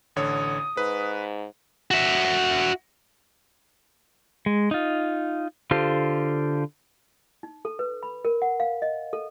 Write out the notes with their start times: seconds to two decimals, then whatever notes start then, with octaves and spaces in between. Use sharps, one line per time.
0.16 A1 D3 C#5 D#6
0.77 G#2 B4
1.91 F#4 E5
4.46 G#3
4.71 D#4 F4
5.71 D3 F4 G4 A4 C5
7.43 D#4
7.65 A4
7.79 B4
8.03 B5
8.25 A#4
8.42 F#5
8.60 F5
8.82 D#5
9.13 A4